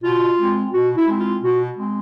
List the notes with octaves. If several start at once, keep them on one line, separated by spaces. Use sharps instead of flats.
B2 F4
G#3
C4
B2 F#4
E4
G#3 C4
F4
B2 F#4
G#3 C4